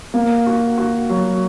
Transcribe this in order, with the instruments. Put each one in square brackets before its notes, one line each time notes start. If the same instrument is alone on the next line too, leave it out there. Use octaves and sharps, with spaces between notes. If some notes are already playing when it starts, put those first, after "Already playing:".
[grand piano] A#3
F#4
F#4
F#3